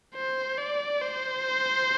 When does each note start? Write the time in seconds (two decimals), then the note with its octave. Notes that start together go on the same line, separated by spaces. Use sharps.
0.15 C5
0.58 D5
1.01 C5